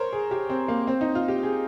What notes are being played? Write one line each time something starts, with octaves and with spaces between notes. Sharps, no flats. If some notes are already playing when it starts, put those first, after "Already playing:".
Already playing: A#4 C5 C#5
G#4
G4
C4
A#3
C4
D#4
F4
G4
G#4